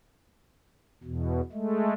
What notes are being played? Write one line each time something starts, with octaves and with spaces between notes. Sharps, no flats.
E2 B2
G#3 A3